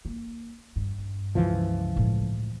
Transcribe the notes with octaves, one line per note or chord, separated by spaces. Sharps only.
A#3
G2
C#2 E3 F3
A2 G#3